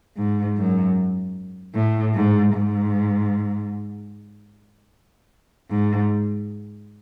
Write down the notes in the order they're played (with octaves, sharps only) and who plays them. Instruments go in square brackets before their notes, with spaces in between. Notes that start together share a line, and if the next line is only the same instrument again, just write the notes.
[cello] G#2
F#2
A2
G#2
G#2
G#2